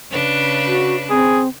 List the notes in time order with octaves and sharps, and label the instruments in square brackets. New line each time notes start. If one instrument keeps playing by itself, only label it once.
[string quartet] C#3 D4 B4
[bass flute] F#4
[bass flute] C4 [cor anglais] G#4